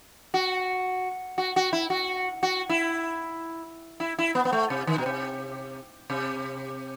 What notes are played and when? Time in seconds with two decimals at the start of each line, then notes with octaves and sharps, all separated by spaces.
0.34 F#4
1.38 F#4
1.56 F#4
1.73 E4
1.90 F#4
2.43 F#4
2.70 E4
4.00 E4
4.19 E4
4.35 B3
4.45 B3
4.53 A3
4.70 C3
4.87 D#3
4.98 B2
5.06 C3
6.10 C3